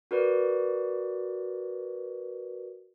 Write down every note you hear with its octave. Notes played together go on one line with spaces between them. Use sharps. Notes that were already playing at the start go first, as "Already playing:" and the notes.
F#4 A#4 B4 D5